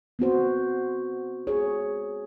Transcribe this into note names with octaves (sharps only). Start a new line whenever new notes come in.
B3 C4 F#4 C5
G#4 C#5